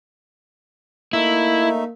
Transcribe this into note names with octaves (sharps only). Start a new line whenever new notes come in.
A3 A#3 D#4 E4 E5